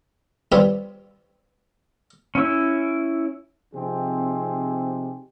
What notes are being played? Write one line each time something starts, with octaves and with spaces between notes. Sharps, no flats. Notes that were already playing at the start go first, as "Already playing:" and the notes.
G3 C4 F4 B4 C#5
C#4 E4 E6
C3 F3 C4 D#4 G#4